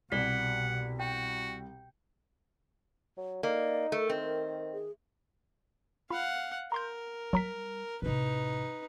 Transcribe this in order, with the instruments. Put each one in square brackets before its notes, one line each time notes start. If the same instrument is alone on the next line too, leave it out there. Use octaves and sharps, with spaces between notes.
[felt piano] C2 [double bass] B2 [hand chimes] D5 B6 [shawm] F#5
[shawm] F#4 [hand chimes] G5
[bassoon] F#3
[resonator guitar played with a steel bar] A#3 [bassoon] D#4 [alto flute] D5
[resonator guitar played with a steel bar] A3 [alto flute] A#4
[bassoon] D#3 [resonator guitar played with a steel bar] C4
[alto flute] G#4
[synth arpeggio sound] F4 B5 [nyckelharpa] F5 F#5
[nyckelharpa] A#4 [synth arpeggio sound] A#5 C6 G6
[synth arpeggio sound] F#3 A#5 B6 [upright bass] G3
[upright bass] A1 C3 [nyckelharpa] D#4 B4